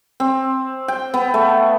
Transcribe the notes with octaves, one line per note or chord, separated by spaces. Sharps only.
C4
G5
B3
A3